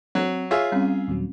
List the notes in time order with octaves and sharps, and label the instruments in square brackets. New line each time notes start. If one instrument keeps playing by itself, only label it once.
[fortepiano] F#3 [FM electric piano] C4
[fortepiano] F4 G#4 E5 [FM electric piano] C#5
[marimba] G3 C4 C#4
[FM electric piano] D#2 A#2 F#3